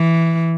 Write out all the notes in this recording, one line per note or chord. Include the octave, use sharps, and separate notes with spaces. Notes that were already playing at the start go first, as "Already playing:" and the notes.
Already playing: E3